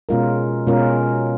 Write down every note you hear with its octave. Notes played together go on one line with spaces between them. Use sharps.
B2 G#3 C#4 F4 A#4
B2 G#3 C#4 F4 A#4